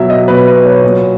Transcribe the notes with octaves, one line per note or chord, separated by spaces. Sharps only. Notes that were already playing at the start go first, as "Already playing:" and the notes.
Already playing: B2 F#3 E5
D#5
B2 F#3 B4
B4
C#5
A#2 F#3